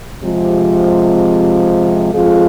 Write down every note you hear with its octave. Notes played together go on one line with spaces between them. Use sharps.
C3 F3 G#3
F2 F3 G#3 F4 G#4